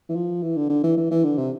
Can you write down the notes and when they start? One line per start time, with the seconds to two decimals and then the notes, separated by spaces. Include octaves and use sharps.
0.09 E3
0.15 F3
0.42 E3
0.56 D3
0.70 D3
0.84 E3
0.97 E3
1.11 E3
1.24 D3
1.38 C3